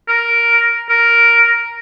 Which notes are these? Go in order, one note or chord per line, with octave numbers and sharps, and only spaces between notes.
A#4
A#4